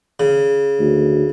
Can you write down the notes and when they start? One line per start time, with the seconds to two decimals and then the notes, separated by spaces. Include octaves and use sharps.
0.20 C#3
0.80 D2